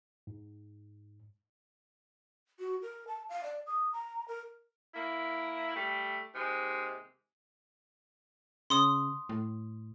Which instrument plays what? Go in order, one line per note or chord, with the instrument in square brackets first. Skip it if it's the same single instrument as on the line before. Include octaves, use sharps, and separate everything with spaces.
[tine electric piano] G#2
[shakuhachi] F#4
A#4
A5
F5
D5
D#6
A#5
A#4
[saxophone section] A#3 E4
G3 A3
D#2 C3 G#3
[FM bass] C#3 [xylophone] C6 D#6
[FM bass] A2